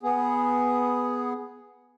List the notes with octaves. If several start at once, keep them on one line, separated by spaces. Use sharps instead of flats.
B3 G#4